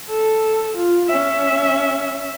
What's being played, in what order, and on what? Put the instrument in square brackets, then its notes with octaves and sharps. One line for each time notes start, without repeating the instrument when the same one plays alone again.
[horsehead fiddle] A4
F4
C#4 E5